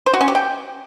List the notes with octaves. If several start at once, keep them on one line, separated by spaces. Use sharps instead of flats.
C5
F#4
C#4
G4
G5